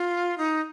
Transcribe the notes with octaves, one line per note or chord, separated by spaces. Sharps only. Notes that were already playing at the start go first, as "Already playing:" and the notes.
Already playing: F4
D#4